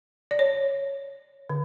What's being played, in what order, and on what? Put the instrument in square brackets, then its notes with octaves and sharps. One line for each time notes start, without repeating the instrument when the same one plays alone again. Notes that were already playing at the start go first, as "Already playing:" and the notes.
[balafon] D5
C#5
D3